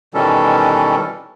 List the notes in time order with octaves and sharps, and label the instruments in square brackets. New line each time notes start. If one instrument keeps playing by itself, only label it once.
[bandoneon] B2 D#3 E3 G3 C#4 A4